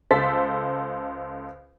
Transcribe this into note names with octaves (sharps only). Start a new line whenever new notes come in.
C#2 A4 C5 A6 B6